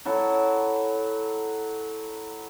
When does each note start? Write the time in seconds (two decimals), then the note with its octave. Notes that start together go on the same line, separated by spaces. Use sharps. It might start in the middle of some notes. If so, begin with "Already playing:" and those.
0.05 F#3 E4 A4